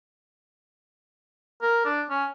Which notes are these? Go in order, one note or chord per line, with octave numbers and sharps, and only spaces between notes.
A#4
D4
C#4